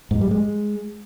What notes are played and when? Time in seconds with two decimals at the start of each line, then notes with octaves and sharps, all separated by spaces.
0.11 G#2
0.21 G3
0.31 G#3